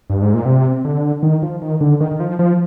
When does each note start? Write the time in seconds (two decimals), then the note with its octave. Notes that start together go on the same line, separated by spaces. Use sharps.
0.10 G2
0.22 G#2
0.34 A#2
0.45 C3
0.85 D3
1.23 D#3
1.43 F3
1.62 D#3
1.81 D3
2.01 D#3
2.11 D#3
2.20 F3
2.39 F3